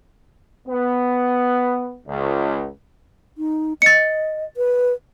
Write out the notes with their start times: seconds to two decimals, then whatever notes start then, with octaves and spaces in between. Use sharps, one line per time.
0.68 B3
2.07 C#2
3.38 D#4
3.82 D#5 A6 C#7
4.57 B4